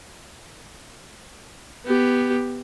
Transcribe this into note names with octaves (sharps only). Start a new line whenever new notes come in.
B3 G4